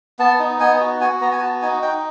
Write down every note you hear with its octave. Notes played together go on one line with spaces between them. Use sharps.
B3 A5
D#4
B3 G#5
F#4
F#4 G#5
B3 A#5
G#5
F#4 A5
D#4 G#5
D#4 G5